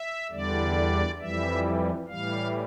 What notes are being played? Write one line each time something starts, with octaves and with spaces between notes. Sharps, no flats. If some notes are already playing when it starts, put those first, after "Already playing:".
Already playing: E5
E2 D3 G3 D5
F2 E3 G3 E5
A2 E3 G3 F5